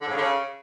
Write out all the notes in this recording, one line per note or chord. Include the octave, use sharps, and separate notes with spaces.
D3
G#2
C#3
D3
C#3